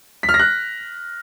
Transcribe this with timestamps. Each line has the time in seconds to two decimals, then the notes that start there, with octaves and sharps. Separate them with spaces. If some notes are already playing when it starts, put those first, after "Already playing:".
0.23 B6
0.29 F6
0.34 A#6
0.39 F#6